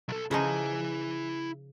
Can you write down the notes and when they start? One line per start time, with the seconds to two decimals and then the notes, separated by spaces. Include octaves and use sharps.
0.08 B1 A4
0.31 C#3 F3 D#4 E4 G#5